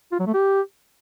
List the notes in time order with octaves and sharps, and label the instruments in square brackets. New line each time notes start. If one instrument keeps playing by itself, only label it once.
[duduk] F4
F#3
A3
G4